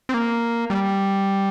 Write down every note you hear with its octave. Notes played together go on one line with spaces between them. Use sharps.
C4
A#3
G3